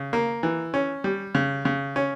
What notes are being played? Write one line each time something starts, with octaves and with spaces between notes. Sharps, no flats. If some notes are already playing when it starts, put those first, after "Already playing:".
Already playing: C#3
A#3
E3
C#4
G3
C#3
C#3
C#4